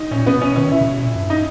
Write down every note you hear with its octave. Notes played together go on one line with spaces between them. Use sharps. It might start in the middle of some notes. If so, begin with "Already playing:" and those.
Already playing: D#4
A#2 C#4
B2 B3
B2 C#4
D#3 C#4
B2 E4
C#3
B2
A#2
G2
D#4